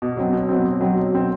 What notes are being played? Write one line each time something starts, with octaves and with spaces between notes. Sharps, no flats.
B2
F#3 C4
B2
F#3 C4
B2
F#3 C4
B2
F#3 C4